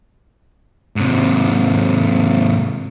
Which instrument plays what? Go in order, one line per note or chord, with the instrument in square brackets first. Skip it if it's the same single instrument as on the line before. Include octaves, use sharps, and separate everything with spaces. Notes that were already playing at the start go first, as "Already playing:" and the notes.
[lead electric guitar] G#2 C3